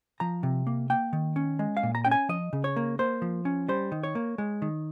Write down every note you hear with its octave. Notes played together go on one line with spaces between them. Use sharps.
F3 A#5
C3
A#3
A#3 G5
D#3
C#4
G#3
F5
A#2
A#5
C#4 G5
G#5
F3 D#5
C#3
C#5
A#3
A#3 C5
F3
C#4
G3 C5
D#3
C#5
A#3
G#3
D#3